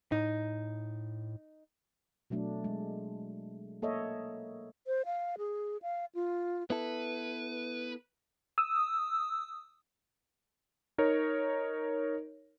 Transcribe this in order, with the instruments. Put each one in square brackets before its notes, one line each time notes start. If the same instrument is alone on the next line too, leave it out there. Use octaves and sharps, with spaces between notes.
[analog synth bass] A2 [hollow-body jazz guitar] D#4
[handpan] B2 F#3 A3 D4
G#3
A#3 A4 C#5 D#5 E5
[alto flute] C5
F5
G#4
F5
F4
[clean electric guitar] B3 E4 A4 [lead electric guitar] B4
[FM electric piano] D#6 E6
[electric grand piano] D#4 A#4 C#5